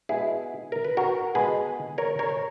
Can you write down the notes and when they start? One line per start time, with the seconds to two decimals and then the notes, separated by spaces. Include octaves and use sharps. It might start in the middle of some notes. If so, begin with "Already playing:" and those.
0.09 B2 G#3 E4 G#4
0.72 A#4
0.84 B4
0.97 F#4 A#4
1.35 B2 G#3 G#4 B4
1.98 A#4 C#5
2.19 A#4 C#5